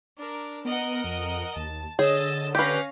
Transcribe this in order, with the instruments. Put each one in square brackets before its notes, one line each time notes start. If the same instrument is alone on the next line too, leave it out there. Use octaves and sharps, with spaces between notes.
[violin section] D4 A#4
[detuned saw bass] B3 [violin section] A#4 D#5 F#5
[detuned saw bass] F2
[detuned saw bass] D#2 [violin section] A5
[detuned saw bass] D3 [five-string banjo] G#4 [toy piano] C#5 [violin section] D#5 E6 A6
[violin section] C#4 F5 A#6 [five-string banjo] G4 B4